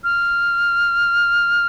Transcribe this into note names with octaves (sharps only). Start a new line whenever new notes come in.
F6